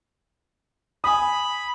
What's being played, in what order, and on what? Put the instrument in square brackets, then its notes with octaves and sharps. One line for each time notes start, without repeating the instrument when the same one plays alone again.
[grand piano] G#5 D#6 [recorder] B5